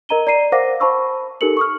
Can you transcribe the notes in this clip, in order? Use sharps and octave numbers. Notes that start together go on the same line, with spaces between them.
A#4 D#5 A#5 D#7 G7
D5 A#5 C7 D#7
A#4 C5 F5 F#5 D6 A#6
C5 A5 B5 C#6 E6
D#4 G4 A4 A#4 C#7 F#7
C#6 D#6 F6